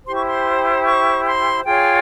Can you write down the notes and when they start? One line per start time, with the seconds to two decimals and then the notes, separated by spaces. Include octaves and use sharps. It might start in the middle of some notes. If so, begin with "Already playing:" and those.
0.05 E4 G4 C5 C6
0.16 C#6
0.27 C6
0.85 C#6
1.25 C6
1.64 F4 G#4 C#5 G5